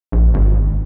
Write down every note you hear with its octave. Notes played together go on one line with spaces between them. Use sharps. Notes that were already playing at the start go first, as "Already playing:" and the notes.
A#1
G#1